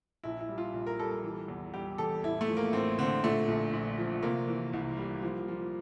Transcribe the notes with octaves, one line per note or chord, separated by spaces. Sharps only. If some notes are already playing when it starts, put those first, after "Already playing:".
A#1 E4
E4
G3
F4
A#1
A#4
G3 A4
A4
E3
E2
G3 G4
E2 A4
A1 E4
A3
F3
A#3
A1 C4
D3 C4
A#2 A3
A#1
A#1
F3
C3 A#3
E3
C2
G3
F3
F3